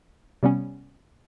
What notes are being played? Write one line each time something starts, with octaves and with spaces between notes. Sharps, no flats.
C3 G3 B3 C#4